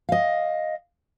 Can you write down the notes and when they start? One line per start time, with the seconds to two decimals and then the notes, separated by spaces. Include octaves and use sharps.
0.09 D#5 F5